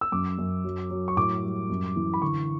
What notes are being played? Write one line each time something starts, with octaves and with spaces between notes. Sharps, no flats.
E6
F#2 D6
F#2
F#3
F#3
C#6
A2 D6
G3
F#2
E3
B5
D3 C#6